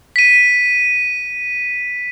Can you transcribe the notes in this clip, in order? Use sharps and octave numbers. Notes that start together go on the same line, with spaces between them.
B6 D#7